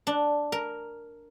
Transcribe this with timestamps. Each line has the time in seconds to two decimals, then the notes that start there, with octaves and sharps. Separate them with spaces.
0.07 D4
0.52 A#4